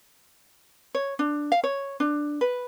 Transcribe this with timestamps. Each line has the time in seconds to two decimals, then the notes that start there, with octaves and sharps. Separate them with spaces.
0.95 C#5
1.19 D4
1.52 F5
1.64 C#5
2.00 D4
2.41 B4